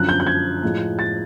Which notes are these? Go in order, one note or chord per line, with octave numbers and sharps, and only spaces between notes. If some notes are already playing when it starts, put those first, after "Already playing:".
Already playing: F#2 D3 F3 F#6
G6
G6
G#6
A2 F3 G#3
A6